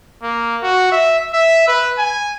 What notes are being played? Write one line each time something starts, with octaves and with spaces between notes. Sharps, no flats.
A#3
F#4
E5
E5
B4
G#5